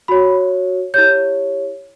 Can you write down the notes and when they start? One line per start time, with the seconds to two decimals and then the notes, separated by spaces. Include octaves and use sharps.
0.08 F#4 C#5 B5
0.94 E4 G4 C#5 G6